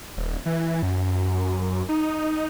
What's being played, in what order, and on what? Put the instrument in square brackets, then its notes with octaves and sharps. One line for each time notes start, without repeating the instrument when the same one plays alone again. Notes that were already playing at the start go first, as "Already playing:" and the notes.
[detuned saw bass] D#1
E3
F#2
D#4